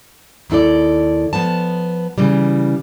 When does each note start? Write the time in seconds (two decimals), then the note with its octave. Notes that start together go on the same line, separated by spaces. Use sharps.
0.50 D#2 D#3 E4 A4 D5
1.33 F3 B3 A5
2.18 C#3 E3 G3